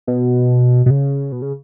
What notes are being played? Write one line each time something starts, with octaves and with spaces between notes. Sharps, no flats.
B2
B2
C#3
B2
C#3